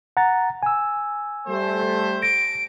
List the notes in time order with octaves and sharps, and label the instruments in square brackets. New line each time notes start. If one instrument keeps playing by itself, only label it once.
[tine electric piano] F#5 A#5 A6
G#5 E6
[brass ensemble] G3 A3 C5
[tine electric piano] A#6 [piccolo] D7